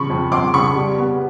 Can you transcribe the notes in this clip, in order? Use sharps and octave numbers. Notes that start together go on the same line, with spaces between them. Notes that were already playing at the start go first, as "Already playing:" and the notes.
Already playing: C#3 F3 B5 C#6
F2
F2 C6 D6
C#3 B5 C#6
G3
B3